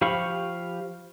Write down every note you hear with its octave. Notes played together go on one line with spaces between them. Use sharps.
F3 G4 F5 B5 C#6